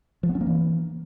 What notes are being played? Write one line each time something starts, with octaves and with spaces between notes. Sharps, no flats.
F3
B3
C#4
A#3
E3